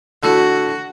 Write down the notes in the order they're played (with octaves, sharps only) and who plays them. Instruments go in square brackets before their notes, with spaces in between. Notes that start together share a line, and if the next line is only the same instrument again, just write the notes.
[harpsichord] D3 A3 E4 [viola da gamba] F#4